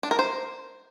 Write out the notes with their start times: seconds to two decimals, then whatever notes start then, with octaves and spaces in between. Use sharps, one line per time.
0.03 D4
0.11 A#4
0.19 C5